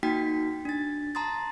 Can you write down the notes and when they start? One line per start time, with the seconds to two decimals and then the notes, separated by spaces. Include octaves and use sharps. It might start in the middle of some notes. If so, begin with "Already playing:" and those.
0.03 A#3 D#4 F#4 G5 B6
0.65 D4 A6
1.15 A5 A#5 C6 D#6 A6